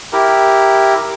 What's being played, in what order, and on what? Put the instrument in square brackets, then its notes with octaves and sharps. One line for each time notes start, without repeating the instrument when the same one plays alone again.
[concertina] E4 G4 A#4